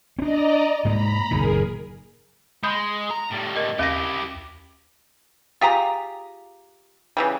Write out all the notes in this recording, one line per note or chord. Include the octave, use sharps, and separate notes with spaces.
C4 D4 D5 D#5 A#5
G#2 G#3 A#3 A#5 B5
F#1 A#2 D#3 G#4 A#4
G#3 B5 D#6 G6
A#5
A2 G3
A#4 D#5
D#2 E4 G4 F5 A#6
F4 G4 G#4 A#5
C#3 E3 G3